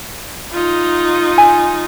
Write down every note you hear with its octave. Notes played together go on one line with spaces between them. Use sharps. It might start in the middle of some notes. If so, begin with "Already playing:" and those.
D#4 F4
G#5